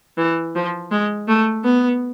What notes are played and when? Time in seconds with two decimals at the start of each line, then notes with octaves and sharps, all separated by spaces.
0.18 E3
0.55 F3
0.91 G#3
1.28 A3
1.65 B3